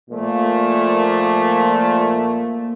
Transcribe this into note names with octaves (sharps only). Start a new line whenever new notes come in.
A#2 F3 A3 A#3